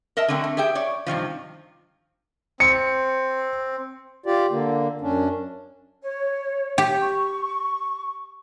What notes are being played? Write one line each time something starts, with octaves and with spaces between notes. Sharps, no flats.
A#4 D#5 E5 A5
D3 F#3 A3 C4
A3
G4 G#4 E5 G5
C#5 D5
G2 C3 D#3 F3
C4 C#7
F4 G4 D5
D3 A#3
F#2 C#4 D4
C#5
G4
C#6